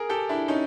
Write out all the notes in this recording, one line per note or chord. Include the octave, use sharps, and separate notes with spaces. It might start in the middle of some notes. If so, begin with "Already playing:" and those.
Already playing: G#4 A#4
G4 A4
D4 E4
C#4 D#4